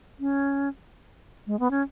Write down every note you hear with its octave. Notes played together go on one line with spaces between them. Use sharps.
C#4
G#3
B3
C#4